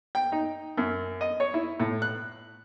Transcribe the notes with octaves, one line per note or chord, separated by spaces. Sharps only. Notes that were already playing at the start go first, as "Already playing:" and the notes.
G5
D#4
F#2
D#5
C#5
E4
A2
F#6